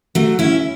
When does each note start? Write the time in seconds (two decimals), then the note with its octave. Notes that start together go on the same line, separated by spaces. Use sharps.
0.15 F#3 A3
0.39 C#4 E4